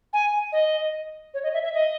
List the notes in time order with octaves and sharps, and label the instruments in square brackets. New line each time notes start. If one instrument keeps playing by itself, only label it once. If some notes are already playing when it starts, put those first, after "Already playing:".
[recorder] G#5
D#5
C#5
D#5
E5
E5
D#5